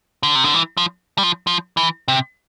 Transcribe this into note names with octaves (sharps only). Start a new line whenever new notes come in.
D3
C3
D3
E3
F3
G3
F3
F3
E3
C3